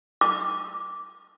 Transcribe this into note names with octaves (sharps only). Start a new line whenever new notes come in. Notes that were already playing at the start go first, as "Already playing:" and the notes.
D6